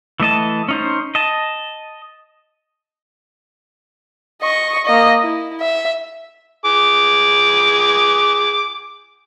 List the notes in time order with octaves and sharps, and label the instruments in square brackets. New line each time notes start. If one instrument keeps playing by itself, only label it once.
[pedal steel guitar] E3 A3 D#5 A5
C#4 D#4 C5
D#5 A5
[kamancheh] D#5 C#6
A#3 D#5
E4
E5
[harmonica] G#4 D6